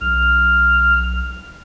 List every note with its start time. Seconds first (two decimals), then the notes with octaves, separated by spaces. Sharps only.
0.01 B1 F6